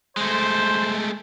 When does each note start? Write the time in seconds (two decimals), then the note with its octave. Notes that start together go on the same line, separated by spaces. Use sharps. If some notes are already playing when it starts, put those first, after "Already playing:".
0.17 G#3 A3 C5